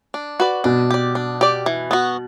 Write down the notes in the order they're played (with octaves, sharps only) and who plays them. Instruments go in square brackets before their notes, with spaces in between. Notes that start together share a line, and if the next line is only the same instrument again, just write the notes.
[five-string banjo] D4
F#4 B4 D5
[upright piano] B2 [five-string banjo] D4
[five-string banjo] G4 D5
D4
G4 D5
E3
B3 F#4